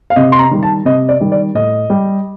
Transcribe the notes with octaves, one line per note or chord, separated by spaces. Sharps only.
F5
C3 D#5
C6
A#5
D#3 G3
A5
C3 D#5
D5
D#3 G3
D5
A2 D#5
G3